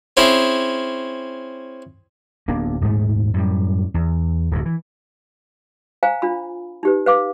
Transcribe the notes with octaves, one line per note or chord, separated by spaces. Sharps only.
C4 C#4 E4 G#4
D1 A#3 B3 D4
D#1 G#2 G#3 A3
F#2 A2 G3
E2
D1 D2 G2
E3
C5 F5 G#5 A#5
D4 F4 B5
D#4 G4 B4
B4 F5 D6